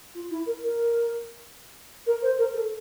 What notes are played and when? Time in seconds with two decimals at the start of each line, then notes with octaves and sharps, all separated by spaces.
0.15 F4
0.30 E4
0.46 A#4
0.63 A#4
2.07 A#4
2.22 C5
2.38 A#4
2.54 A4